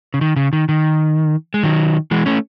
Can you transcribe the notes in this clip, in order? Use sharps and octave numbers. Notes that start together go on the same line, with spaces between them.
C#3
D#3
C#3
D#3
D#3
G#3
D#3 F#3
E3 G#3
A3 C#4